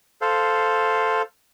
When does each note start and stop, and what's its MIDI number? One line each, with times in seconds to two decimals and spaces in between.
0.21 1.22 69
0.21 1.22 72
0.21 1.22 77